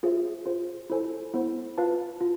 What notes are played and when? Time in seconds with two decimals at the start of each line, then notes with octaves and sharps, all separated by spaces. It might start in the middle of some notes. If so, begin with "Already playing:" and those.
0.03 F4 G#4 C5 E5
0.46 F4 G#4 C5
0.90 E4 A4 C5 G#5
1.34 B3 E4 A4 C5
1.78 F4 B4 F5 A5
2.21 F4